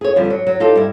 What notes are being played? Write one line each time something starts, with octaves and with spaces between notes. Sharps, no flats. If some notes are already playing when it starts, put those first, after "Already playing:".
G#4 C#5
F2 D3 F3 G3
F#3
F#3
D#4 F4 G4 A4
G2 E4